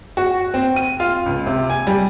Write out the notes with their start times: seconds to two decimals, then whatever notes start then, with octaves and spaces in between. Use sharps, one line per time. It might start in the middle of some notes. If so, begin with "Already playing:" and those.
0.17 F#4
0.54 C4
0.76 D#7
1.00 F4
1.26 C#2
1.46 C3
1.70 G#5
1.87 G3